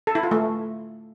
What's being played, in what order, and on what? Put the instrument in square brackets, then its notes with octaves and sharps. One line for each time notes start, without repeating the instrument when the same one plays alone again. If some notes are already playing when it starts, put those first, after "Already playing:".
[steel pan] A4
E4
F4
A3